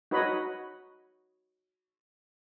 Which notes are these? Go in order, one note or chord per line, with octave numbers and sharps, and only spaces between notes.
D#4 F#4 B4 C#5 D#5 B5